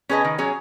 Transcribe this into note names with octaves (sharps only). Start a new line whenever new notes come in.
C#4 G#4 B4 D#5
D#3
F#3 C#4 G#4